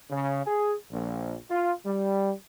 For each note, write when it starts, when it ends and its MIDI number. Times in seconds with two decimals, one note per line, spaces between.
0.10 0.42 49
0.46 0.73 68
0.91 1.36 34
1.50 1.71 65
1.85 2.31 55